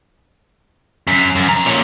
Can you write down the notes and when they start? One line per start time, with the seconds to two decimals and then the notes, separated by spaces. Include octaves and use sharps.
1.07 F#2
1.36 F#2
1.49 F2 A#5
1.66 A#2 C#4